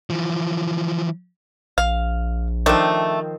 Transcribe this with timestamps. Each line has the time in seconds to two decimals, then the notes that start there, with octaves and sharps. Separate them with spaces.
0.10 E3 F3
1.78 A#1 F5
2.66 D#3 F3 A3 C4 D4